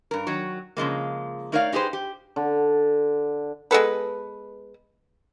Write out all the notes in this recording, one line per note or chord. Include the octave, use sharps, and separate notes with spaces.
G2 A#4
D#3 F#3 C#5
C#3 F3 G#3 A#3
A3 D#4 A#4 C#5 D5 F5
D#4 G4 G#4 B4 C5
G4
D3
G#3 B3 A4 B4